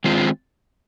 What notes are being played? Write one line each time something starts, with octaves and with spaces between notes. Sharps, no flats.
D#3 G#3 C4 F4 G#4